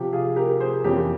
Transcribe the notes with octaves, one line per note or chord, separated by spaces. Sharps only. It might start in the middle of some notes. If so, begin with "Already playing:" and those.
Already playing: C3 F3 C4 G4
F4 G#4
G4 A#4
G#4 C5
F2 E3 A#3 C#4 G4